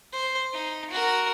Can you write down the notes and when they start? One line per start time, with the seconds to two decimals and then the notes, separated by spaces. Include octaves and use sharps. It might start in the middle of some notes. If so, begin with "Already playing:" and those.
0.12 C5
0.53 D#4
0.91 F#4 A#4